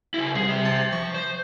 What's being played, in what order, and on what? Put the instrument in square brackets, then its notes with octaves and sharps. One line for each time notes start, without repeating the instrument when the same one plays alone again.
[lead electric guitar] C#3 E4
[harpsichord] C2 [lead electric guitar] G#4
[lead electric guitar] C5 E5
[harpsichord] A5
[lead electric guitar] F3 [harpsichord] C#6
[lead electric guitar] C5